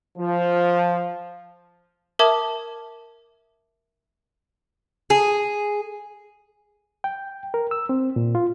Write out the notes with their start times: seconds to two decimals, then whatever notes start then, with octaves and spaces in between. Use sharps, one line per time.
0.18 F3
2.19 A#4 E5 A5 D6 D#6 G#6
5.10 G#4
7.04 G5
7.54 A#4
7.71 E6
7.89 C4
8.16 A#2
8.35 F4